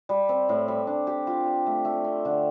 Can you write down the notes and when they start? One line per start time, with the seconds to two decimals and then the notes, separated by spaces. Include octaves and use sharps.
0.09 G3
0.29 C4
0.49 A2
0.68 G3
0.87 D4
1.07 G4
1.27 F4
1.46 C5
1.66 A3
1.85 A3
2.04 C4
2.25 D3